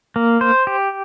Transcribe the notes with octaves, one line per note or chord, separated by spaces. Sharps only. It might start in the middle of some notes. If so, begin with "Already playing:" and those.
A#3
C5
G4